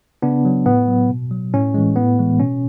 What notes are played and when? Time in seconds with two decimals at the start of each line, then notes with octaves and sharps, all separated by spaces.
0.22 C#3 B3 D4
0.45 F#3
0.66 A2 B3
0.88 F#3
1.10 B2
1.31 F#3
1.54 A2 C#4
1.74 E3 G#3
1.96 A2 B3
2.19 E3 G#3
2.40 B2 C#4